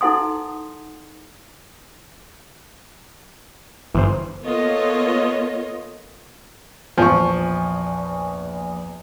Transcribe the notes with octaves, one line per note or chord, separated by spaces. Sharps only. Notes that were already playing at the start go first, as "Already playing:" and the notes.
D#4 E4 A4 F#5 C6 D#6
G1 E3 C5
A#3 B3 F4 A4 C#5 D#5
A#1 E2 F3 G#5 C#6